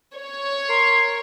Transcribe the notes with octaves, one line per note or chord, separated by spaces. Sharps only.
C#5
A#4 C6